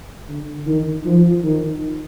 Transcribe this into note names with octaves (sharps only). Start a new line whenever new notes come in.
D3
D#3
F3
D#3